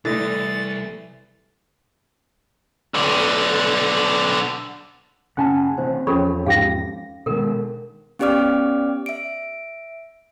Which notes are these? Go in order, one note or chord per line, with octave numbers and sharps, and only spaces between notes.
C2 E3 G3 A3 A4 D#5 A6
B1 D3
F#1 C#3 C#4 F#5 G#5 A5
C3 E3 C4 C5
E2 F3 C#4 G#4 A4 C#5 B5
G#2 G4 F5 A#6
B2 D#3 G#3 A4 A#4
B3 C#4 G4 D5 D6 F6
E5 D7